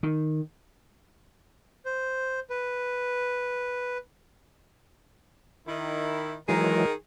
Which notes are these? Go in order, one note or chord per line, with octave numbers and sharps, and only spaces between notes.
D#3
C5
B4
D#3 E4
D#3 E3 F#3 G#3 G#4 A#4